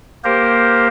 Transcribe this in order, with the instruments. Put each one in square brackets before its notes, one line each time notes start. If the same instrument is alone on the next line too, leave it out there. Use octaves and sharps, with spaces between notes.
[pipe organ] A#3 G4 A#4 C5